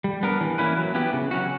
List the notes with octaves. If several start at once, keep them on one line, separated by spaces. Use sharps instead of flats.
G3
B3 D4 A#4
E3
A#3 C#4 E4 B4
F#3
B3 E4 G4
C#3
F#3 C#4 F#4